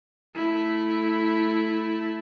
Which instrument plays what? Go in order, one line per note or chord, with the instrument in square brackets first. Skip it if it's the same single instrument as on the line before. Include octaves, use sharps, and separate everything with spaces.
[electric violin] A3 E4